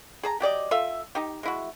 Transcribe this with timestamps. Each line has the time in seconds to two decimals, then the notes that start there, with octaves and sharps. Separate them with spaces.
0.23 G#4 A5 A#5
0.40 F#3 G4 D5 D#5
0.71 F4 A4 E5
1.15 D#4 G4
1.43 G#3 E4 F#4